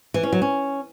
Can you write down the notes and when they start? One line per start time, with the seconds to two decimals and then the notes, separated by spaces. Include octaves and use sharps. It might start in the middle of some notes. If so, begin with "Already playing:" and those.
0.14 E3
0.23 C#4
0.32 F#3
0.42 C#4